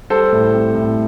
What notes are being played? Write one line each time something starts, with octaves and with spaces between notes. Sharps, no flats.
G3 A4 C5
A2
C4
A2